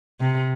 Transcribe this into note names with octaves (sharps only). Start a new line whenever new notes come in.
C3